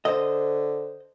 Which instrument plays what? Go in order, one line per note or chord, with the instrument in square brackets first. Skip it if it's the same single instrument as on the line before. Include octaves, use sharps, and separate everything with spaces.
[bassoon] D3 [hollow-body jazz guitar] C5 D#5